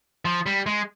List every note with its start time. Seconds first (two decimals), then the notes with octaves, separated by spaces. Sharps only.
0.25 F3
0.46 G3
0.66 G#3